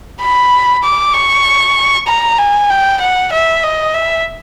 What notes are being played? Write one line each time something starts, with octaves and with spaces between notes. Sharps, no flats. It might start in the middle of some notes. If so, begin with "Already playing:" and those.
B5
D6
C#6
A#5
G#5
G5
F#5
E5
D#5
E5